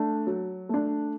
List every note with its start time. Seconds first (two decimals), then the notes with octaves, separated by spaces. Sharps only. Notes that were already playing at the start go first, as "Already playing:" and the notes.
Already playing: A3 D4
0.27 F#3
0.69 A3 D4